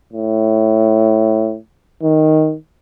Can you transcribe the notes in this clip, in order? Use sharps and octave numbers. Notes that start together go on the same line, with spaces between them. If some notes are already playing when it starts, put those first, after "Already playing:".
A2
D#3